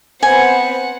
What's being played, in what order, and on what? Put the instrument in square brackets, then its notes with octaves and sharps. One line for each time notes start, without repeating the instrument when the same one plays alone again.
[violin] B3 C4 [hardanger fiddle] F#5 [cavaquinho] G#5